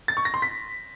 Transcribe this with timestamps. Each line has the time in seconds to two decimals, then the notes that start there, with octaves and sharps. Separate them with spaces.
0.08 A6
0.17 C#6
0.25 A#6
0.34 C6
0.42 B6